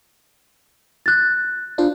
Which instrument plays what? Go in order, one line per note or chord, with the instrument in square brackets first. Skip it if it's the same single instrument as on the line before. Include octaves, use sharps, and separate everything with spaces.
[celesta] F#6 A6
[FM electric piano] D4 F4 C5